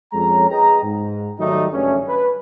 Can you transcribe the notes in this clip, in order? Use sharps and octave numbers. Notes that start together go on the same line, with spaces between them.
F2 G#3 C#4 A4 C#5 A#5
G#4 B4 D#5 G5 A#5
G#2
D#3 F#3 G3 A3 A#3 D#4
F#1 G2 A3 C#4
B4